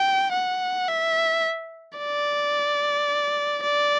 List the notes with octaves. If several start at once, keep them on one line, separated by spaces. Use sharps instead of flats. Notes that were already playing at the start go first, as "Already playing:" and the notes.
Already playing: G5
F#5
E5
D5
D5